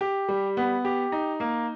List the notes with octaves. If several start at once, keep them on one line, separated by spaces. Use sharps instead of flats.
G4
G3
B3
G4
D#4
A#3